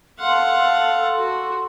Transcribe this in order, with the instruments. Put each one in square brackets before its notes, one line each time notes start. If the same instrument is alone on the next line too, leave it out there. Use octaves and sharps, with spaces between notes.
[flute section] A4 C6 [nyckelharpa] F5 F#5
[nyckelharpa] F#4